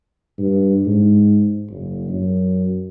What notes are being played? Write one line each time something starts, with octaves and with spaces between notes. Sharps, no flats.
G2
G#2
F#1
F#2